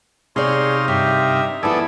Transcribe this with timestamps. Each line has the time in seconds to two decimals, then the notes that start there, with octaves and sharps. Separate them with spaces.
0.36 C3 D#4 G#4 C#5 D5 F5 C6
0.88 G2 G4 E5
1.63 F3 B3 E4 G#4 A4 D5 E5